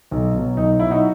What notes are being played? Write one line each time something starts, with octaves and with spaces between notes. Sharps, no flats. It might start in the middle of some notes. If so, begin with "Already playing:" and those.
B1
B2 F#3
B1 D#4
B2 F#3 E4
D#4 F#4